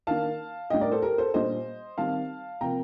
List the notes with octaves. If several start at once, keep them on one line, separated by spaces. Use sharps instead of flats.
D#3 A#3 D4 F5 A5
A2 G3 D4 D#5 G5
A#4 D5
A4 C5
G4 A#4
A4 C5
A#2 G3 D4 C5 D#5
D#3 G3 C4 F5 A5
C3 F3 A#3 G5 A#5